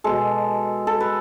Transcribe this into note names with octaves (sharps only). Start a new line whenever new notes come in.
B2 G#3 A4
A4
B4